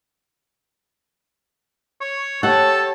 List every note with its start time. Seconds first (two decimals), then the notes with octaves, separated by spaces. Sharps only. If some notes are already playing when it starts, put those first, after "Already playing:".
2.01 C#5
2.43 G4 A4 C#5 F#5 A5